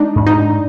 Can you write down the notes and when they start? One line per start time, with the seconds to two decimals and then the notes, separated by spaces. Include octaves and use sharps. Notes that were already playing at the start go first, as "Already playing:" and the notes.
Already playing: G#3 D4 D#4
0.16 G#2
0.26 D#4
0.38 D4